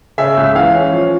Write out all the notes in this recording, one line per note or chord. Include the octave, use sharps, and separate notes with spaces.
C#3 E5
C#2
E3 F5
C#4
F3